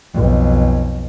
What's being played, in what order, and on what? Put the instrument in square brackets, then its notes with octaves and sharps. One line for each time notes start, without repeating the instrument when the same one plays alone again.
[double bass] B1 F2